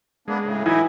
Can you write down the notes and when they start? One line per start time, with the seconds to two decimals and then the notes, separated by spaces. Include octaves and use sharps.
0.28 G#3 A#3 B3 D4
0.44 A2 C#3
0.66 A2 E3 F#3 D#4 E4 G#5